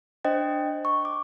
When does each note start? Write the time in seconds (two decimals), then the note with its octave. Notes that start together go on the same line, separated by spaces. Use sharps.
0.25 D4 C5 D#5 G5
0.85 C#6
1.05 D6